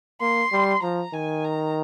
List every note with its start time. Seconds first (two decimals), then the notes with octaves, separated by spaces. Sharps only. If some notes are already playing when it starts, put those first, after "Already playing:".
0.21 A#3 C6
0.53 G3
0.82 F3 A#5
1.14 D#3 G#5
1.44 A#5